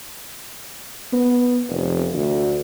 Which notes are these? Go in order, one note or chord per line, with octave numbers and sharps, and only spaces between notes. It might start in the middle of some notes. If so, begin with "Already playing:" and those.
B3
F1
D2